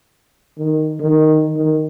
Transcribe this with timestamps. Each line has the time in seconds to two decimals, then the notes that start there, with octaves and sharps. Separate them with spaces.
0.58 D#3
1.00 D#3
1.56 D#3